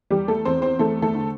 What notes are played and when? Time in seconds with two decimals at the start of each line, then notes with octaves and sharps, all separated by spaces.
0.10 E2 G3 G4
0.28 A3 A4
0.45 E2 C4 C5
0.62 C4 C5
0.79 A3 C4 A4
1.02 A3 A4
1.14 D3